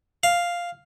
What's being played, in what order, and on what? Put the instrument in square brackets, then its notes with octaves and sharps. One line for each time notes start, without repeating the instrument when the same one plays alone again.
[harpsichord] F5